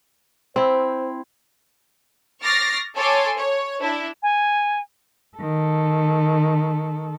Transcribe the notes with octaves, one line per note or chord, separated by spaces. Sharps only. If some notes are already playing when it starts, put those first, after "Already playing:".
C4 E4 C5
C#6 D6 F6 A6 A#6 C7
A4 C#5 G#5 C6 D6
C#5
D4 E4
G#5
D#3 A4